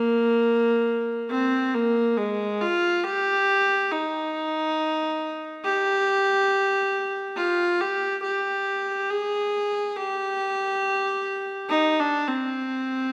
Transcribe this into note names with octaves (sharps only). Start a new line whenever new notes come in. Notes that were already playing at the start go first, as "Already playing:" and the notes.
Already playing: A#3
C4
A#3
G#3
F4
G4
D#4
G4
F4
G4
G4
G#4
G4
D#4
D4
C4